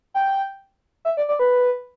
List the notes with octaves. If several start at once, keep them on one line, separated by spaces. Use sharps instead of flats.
G5
E5
D5
D5
B4